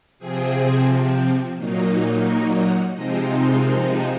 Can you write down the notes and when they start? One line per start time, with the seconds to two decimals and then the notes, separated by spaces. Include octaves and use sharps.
0.19 C3 F3 C4 G#4
1.57 A#2 F#3 A#3 D#4
2.26 A#4
2.60 F#5
2.94 C3 F3 G#3 C4 D#4 D#5
3.28 C5
3.64 A#4